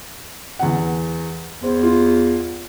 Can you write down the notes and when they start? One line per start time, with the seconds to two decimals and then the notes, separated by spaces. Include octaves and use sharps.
0.59 E2 F#5
1.63 E2 C5
1.83 F4